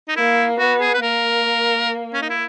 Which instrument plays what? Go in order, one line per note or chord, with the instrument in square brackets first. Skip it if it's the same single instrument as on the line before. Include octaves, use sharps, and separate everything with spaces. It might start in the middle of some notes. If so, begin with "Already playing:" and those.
[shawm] D#4
[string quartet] A#3 [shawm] E4
[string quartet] B3 [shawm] F#4
[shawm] G#4
B4
[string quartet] A#3 [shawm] A#4
[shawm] C#4
D#4
E4